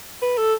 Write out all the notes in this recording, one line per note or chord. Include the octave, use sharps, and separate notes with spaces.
B4
A4